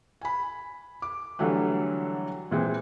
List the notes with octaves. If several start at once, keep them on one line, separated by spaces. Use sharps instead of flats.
G#5 B5
D6
D3 E3 F#3 G3 A3
A#2 E3 G#3 C4